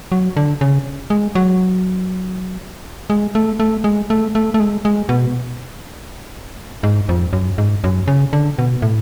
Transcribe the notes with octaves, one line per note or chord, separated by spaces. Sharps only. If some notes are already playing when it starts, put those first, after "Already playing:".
F#3
D3
C#3
G#3
F#3
G#3
A3
A3
G#3
A3
A3
A3
G#3
G#3
B2
G#2
F2
F#2
G#2
F#2
C#3
D3
B2
A2